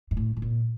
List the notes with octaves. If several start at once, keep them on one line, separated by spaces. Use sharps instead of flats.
G#2
A2
A2
A#2